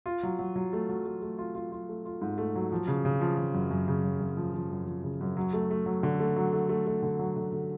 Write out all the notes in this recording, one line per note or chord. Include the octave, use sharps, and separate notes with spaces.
F4
F#3
F#3
F#3
A3
F#3
A3
A3
F4
F4
F4
A3
F4
G#2
A3
F#3
F3
C#3
C#3
F3
F3
F#2
F#2
C#3
F#2
F#2
F3
F3
F#2
F3
C#3
F#2
F#3
A3
A3
F#3
D3
A3
F#3
A3
A3
A3
D3
F#3
D3
D3